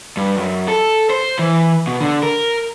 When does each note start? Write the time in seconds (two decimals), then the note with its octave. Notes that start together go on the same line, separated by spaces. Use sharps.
0.17 G2
0.38 F#2
0.68 A4
1.10 C5
1.39 E3
1.87 B2
2.01 D3
2.23 A#4